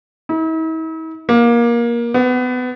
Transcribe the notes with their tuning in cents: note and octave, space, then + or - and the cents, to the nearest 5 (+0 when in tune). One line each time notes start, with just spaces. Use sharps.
E4 -45
A#3 +20
B3 +25